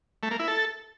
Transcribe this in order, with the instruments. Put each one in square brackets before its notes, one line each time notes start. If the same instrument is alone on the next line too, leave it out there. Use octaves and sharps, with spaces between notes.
[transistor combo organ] A3
A#3
E4
A4